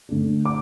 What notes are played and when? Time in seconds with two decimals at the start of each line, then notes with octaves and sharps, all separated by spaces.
0.09 D3 A3 D4
0.45 D6